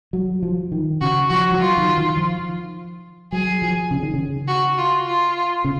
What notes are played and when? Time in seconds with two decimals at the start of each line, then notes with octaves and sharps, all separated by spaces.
0.13 F#3
0.43 F3
0.72 D#3
1.01 C#3 F#4
1.30 F3 F#4
1.52 F3
1.59 F#3 F4
1.77 D#3
1.97 D#3
2.17 F3
3.32 F#3 G#4
3.62 F3
3.91 C#3
4.03 D#3
4.14 C#3
4.48 F#4
4.78 F4
5.06 F4
5.65 C#3